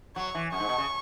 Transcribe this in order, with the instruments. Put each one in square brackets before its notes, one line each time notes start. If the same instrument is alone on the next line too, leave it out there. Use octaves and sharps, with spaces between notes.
[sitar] F#3 [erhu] C#6
[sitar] E3
[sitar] F#2 [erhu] C#6
[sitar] G#2
B2
C#3